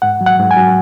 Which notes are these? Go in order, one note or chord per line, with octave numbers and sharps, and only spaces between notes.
G#2 F#5
F#3
F#5
G#2
G#5
F#3